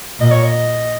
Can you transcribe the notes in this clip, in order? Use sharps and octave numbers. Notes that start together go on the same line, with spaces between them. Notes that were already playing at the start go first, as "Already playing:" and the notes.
A#2 D#5
C#5
D#5